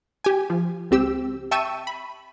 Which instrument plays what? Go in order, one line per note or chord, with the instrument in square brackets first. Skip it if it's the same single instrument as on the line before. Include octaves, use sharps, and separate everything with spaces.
[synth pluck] G4 G#5
F3
C#2 C4 G4 E6
E5 G5 A5 C#6 E6 D#7
B5